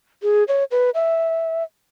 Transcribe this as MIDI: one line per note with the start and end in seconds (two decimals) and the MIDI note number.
0.23 0.44 68
0.48 0.64 73
0.71 0.90 71
0.95 1.63 76